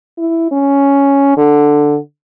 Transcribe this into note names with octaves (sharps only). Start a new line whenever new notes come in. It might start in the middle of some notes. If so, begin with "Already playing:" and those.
E4
C#4
D3